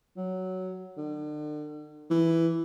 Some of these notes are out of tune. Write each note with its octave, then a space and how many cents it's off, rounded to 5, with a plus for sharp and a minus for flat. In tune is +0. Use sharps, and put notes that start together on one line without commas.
F#3 +5
D3 +40
E3 +5